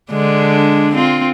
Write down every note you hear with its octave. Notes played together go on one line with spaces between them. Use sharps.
D3 G#3 D4
C4 F4